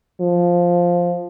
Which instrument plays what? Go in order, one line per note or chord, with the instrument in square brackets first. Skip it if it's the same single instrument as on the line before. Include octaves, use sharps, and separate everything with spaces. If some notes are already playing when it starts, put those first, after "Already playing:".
[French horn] F3